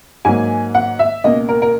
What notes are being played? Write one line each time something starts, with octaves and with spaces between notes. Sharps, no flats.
G#2 F#3 A#3 G#5
F#5
E5
C#2 B2 A#3 D#5
A#4
A#4